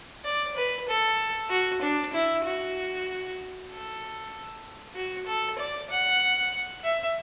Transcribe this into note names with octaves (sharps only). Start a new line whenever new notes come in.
D5
B4
A4
F#4
D4
E4
F#4
A4
F#4
A4
D5
F#5
E5